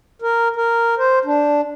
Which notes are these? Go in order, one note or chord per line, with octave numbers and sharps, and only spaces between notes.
A#4
A#4
C5
D4